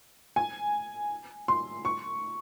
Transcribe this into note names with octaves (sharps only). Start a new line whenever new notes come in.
G#5
C6
C#6